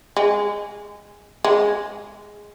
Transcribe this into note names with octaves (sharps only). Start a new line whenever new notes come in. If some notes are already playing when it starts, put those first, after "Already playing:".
G#3
G#3